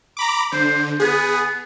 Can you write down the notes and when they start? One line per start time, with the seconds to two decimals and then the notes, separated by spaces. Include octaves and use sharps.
0.17 A#5 B5 D6
0.52 D3 C5
1.00 B3 G#4